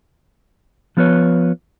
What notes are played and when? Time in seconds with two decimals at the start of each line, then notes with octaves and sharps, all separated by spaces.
0.97 F3 B3 F4 B4 C#5